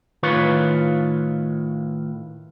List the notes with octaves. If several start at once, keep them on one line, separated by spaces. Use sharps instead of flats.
A2 D#3 F4 B4 C#5